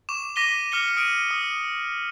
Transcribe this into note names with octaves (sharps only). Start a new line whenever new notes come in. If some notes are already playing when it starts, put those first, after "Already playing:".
C#6 D6 E7
D6 A#6 B6 D#7 G7
D6 F6 A#6 C#7 G7
D#6 F6 D7 D#7
D#6